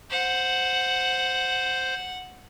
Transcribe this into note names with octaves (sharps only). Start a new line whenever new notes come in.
C5 F#5